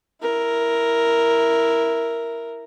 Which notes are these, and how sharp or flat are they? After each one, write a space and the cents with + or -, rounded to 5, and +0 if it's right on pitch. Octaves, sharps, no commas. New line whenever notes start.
E4 +0 A#4 +0